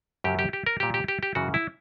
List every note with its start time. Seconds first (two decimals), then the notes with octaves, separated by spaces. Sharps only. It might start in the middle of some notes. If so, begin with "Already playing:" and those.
0.24 F#2 C#3 F#3 G4
0.39 G4
0.53 G4
0.66 A#4
0.80 A#2 G3 G4
0.94 G4
1.08 G4
1.23 G4
1.35 F#2 C#3 E3 F#4
1.54 E4